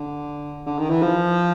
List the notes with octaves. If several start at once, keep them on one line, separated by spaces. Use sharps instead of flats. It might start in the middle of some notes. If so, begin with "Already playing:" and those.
Already playing: D3
D3
D#3
E3
F3